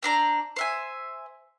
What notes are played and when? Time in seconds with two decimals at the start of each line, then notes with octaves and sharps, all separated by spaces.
0.03 C4 D4 A#5
0.56 C5 E5 G#5